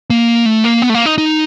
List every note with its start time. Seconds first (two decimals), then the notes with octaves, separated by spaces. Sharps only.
0.10 A#3
0.46 A3
0.64 A#3
0.82 B3
0.90 A3
0.94 A#3
1.06 D#4
1.18 D#4